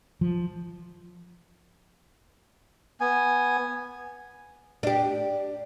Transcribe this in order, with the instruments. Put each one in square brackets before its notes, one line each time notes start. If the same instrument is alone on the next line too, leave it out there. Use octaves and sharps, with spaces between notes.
[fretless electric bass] F3
[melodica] B3 G#5
[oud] D4 G4